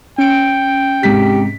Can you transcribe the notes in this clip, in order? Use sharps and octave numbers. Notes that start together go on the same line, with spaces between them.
C#4 G5 C#7 D7
G#2 C3 G4 B6